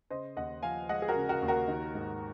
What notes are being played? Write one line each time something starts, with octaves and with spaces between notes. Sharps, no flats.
C#3 C5 D#5
D#2 D#5 F#5
F3 F5 G#5
G#3 D#5 F#5
G#4
F#4 A#4
C#3
F#4 A#4
D#2
F#4 A#4
D#3
G#2